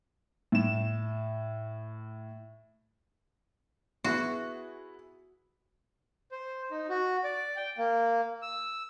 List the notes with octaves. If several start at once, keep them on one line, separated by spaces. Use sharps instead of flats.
A2 E7
B3 E4 F#4 G#4
C5
D#4
F#4
D5
G5
A#3
E6